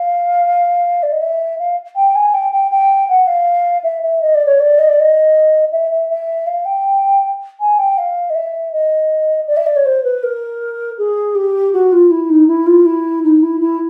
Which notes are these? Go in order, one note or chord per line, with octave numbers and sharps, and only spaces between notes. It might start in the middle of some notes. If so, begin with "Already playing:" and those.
Already playing: F5
D5
D#5
E5
F5
G5
G#5
G5
G5
G5
F#5
F5
E5
E5
D#5
D5
C#5
D5
D#5
D5
D#5
E5
E5
E5
F5
G5
G#5
G5
F5
D#5
E5
D#5
D5
E5
D5
C#5
C5
B4
A#4
G#4
G4
F#4
F4
E4
D#4
E4
F4
E4
D#4
E4
E4